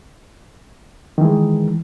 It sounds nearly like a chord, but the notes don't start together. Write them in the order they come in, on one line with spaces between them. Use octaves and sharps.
D#3 E3 G#3